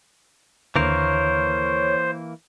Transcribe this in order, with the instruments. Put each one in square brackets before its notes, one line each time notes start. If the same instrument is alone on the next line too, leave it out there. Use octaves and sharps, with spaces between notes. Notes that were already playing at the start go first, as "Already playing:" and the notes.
[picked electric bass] D#2 D3 [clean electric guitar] E3 A#3 A#4 [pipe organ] C5 [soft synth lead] C#5